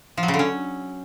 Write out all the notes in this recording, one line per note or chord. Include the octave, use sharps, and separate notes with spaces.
F3
F#3
C#3
D3
C#4